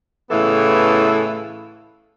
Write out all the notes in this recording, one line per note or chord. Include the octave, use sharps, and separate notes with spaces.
A2 C#3 E3 B3 A4